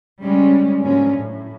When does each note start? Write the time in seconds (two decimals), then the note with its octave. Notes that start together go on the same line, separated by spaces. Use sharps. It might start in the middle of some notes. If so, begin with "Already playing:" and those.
0.21 C#3 G3 G#3 C#4
0.83 G#2 D3 F3 F#3 A#3 C#4
1.18 A2